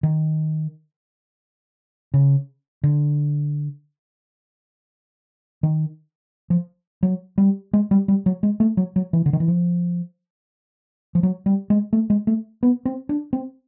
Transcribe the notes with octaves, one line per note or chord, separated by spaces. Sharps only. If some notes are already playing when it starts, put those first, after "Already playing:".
D#3
C#3
D3
D#3
F3
F#3
G3
G#3
G3
G3
F#3
G#3
A3
F#3
F#3
E3
D3
D#3
E3
F3
F3
F#3
G3
G#3
A3
G#3
A3
B3
C4
D4
C4